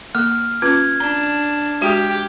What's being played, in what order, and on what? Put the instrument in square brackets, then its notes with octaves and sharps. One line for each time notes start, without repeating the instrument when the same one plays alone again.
[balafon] A#3 [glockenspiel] F6
[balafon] C#4 F4 B4 [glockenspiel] G#6
[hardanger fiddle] D4 [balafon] A#5
[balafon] G#3 F#4 [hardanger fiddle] G4